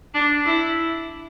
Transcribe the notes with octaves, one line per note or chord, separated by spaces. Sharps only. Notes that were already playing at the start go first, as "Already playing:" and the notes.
D4
E4